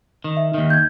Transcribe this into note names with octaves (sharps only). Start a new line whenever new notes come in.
D#3
E5
D#2 D#3
G6 G#6